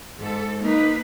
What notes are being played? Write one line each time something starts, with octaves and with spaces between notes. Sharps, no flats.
G#2 A4
A#3 D#4 B4